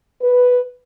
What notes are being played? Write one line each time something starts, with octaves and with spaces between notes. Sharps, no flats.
B4